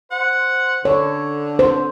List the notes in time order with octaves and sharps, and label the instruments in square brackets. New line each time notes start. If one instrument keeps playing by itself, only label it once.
[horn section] C5 F#5
[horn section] D3 [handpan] C#5
[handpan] C5